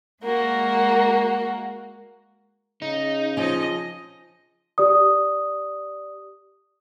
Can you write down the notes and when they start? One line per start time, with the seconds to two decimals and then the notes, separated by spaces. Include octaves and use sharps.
0.22 G#3 A#3 F#4
2.82 C#3 D#4
3.37 F3 C#4 D#5
4.78 G4 D5 D#6